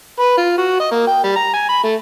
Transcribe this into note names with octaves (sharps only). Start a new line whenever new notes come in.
B4
F4
F#4
D#5
A#3
G5
G3
A#5
G#5
B5
A3